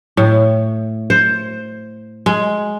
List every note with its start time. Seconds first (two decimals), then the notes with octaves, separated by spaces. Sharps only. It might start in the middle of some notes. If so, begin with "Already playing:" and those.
0.17 A2
1.10 C5
2.26 G#3